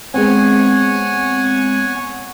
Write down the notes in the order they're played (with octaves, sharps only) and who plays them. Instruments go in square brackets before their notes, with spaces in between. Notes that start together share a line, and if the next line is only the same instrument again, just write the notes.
[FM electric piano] G#3 B3 C4 [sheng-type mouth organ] C#5 F#5 G#5